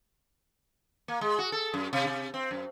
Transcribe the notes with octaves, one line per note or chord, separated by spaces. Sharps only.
A#3
G#3
F#4
A4
F#2
C3
C3
C4
F#2